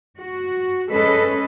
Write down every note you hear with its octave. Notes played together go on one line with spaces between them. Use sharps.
F#4
G#3 C#4 A4 B4 D#5